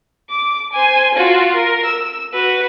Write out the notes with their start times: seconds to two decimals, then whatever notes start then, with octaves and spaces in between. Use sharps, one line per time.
0.30 D6
0.72 C5 G#5
1.14 F4 F#4
1.54 A#4
1.85 E6
2.33 F#4 B4